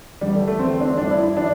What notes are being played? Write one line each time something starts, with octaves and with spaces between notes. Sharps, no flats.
E2 D3 G3
A3
A3
E2 D3 C4
A3
D4
C4
G2 E3 D4
E4
E4
E3 D4